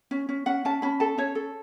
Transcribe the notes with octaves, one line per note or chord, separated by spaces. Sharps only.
C#4
C#4
C#4 F#5
C#4 A5
C#4 B5
A4 A5
C#4 C#5
A4